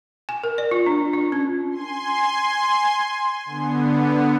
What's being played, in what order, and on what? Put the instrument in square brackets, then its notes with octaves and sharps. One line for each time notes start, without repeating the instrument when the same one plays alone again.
[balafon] G#5
A#4
D5
F4
D4
F4
C#4
[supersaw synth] G#5 C6
D3 B3